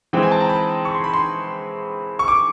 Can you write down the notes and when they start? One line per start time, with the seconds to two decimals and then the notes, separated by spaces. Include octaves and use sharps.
0.13 E3 G#3 C4 G5
0.23 G#5
0.31 A5
0.40 A#5
0.49 B5
0.85 C#6
0.94 C6
1.04 B5
1.13 C6
2.19 C#6
2.28 D6